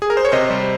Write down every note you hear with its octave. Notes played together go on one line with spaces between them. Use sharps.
G#4
A#4
C5
C#5
C3 C5 D#5
G3